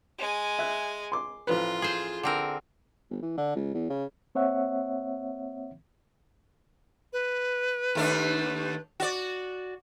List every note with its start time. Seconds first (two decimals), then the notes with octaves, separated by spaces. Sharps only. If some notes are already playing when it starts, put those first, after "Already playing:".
0.18 G#3 G#5
0.59 E5 F#6
1.12 C6 D6
1.47 A1 F3 F4 B4
1.82 G#4 C5
2.23 D3 C4 A#4
3.10 G1
3.22 E3
3.38 D3
3.55 C#2
3.74 E2
3.90 C#3
4.35 A#3 C4 C#5 E5 F#5
7.13 B4
7.95 D#2 A3 D4
9.00 F#4 D5